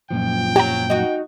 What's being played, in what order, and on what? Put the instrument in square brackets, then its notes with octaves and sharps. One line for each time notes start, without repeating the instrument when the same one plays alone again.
[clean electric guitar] F#2 A#2 F3 [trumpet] G5
[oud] F#3 [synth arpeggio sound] G4 A#5
[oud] D#4 F#4